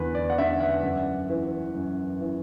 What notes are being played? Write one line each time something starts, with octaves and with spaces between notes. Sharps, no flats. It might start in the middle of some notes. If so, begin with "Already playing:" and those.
Already playing: E2 D3 B4
D5
F#5
D3 E5
F#5
F#2
E3
F#2
E3